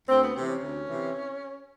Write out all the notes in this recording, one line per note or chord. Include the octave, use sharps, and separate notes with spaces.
D2 C4
B3
C3 E3 C4
C#4
D2
C3 E3